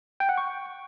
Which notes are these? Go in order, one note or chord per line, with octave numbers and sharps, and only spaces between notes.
G5
F#5
C#6